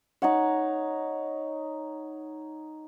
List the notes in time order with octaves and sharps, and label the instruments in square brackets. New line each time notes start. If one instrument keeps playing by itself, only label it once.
[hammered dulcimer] D#4 C#5 F#5